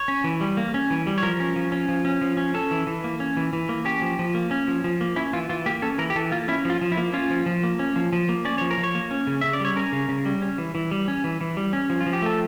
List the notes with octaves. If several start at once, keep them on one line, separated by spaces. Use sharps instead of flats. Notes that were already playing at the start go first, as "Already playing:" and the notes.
Already playing: C#5
C#4
E3
G3
A#3
C#4
E3
G3
C#5
F3 A#4
C#4
F3
C#4
F3
C#4
F3
C#4
C#4 A4
E3
E3
A#3
C#4
E3
E3
A#3
C#4 G4
F3
F3
A#3
C#4
F3
F3
A#3
C#4 E4
E3 F4
E3 F4
A#3 G4
C#4 A4
E3 A#4
G4
E3 A4
A#3 F4
C#4 E4
F3 F4
F3
E4
A#3
C#4 F4
F3
F3
A#3
C#4
F3
F3
A#3
C#4 D5
F3 C#5
A#4
F3
C#5
A#3
C#4
C#3
C#3 E5
D5
G3 C#5
C#4 A#4
C#3
C#3
G3
C#4
E3
E3
G3
C#4
E3
E3
G3
C#4
F3
F4
F3
G4
A3 A4